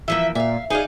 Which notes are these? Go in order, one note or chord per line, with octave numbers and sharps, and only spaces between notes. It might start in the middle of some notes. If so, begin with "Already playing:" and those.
E3 F3 A#3 E5
A#2 E5 F5
D#4 G#4 D5 F5